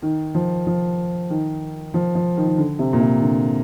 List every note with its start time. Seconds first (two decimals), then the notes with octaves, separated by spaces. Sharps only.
0.02 D#3
0.34 F3
0.66 F3
1.30 D#3
1.94 F3
2.15 F3
2.37 D#3
2.47 D#3
2.58 D3
2.79 C3
2.93 A#2
3.00 C3
3.22 D3